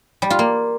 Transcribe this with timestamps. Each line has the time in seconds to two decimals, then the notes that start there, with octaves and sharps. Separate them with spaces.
0.22 G3
0.30 F4
0.39 A#3